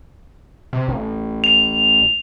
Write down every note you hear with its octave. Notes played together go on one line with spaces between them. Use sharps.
C3
A1
F7